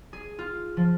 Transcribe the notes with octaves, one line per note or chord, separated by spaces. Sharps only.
G#4
F4
F3